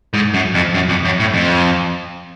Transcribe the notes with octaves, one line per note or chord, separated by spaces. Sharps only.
G#2
F#2
F2
F#2
F2
F#2
A2
F2